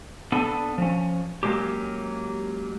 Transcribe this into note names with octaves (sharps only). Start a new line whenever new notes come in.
B3 D4 A4
F3 C#4
F#3 G#3 A#3 C#4 G4